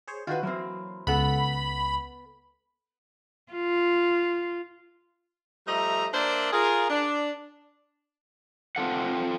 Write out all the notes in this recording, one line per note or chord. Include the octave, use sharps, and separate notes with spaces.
G#4 C5 C#5
D#3 F4 F#4 B4
E3 F#3 A#3 C4
C#2 B3 A4 F#5 B5
F4
F3 G3 A3 D#5 E5 A#5
A#3 D4 A#4 C5 D5 E5
F4 G#4 A#4
D4
C4 F4 A4 F#5